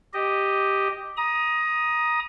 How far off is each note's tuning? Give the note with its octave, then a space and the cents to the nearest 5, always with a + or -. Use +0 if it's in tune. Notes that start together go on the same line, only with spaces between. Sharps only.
G4 +0 D#5 +0
A#5 +25 D#6 +0